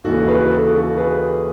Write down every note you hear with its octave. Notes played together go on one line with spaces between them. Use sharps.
D#2 C#3 E3 F#4 A4
G#4 B4
F#4 A4
F#4 A4
G#4 B4